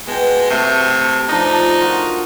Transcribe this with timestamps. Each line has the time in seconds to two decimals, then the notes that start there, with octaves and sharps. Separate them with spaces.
0.07 B2 G#3 G5
0.50 C3 A3
1.29 F3 D4 D#4
1.80 F4 F#4 A#4